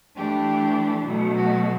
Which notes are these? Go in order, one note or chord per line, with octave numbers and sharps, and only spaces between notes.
E3 A3 D4 G4
B2 F#3 A3
F#4